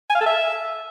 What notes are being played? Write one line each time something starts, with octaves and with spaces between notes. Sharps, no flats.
G#5
F5
A4
E5